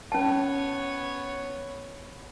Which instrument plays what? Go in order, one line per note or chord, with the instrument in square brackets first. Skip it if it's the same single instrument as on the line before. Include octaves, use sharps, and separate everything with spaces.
[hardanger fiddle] B3 C#5 [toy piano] C#4 A5